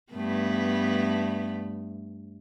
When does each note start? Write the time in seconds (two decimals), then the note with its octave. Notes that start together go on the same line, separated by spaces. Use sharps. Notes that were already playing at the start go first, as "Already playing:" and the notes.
0.13 G2 A3 B3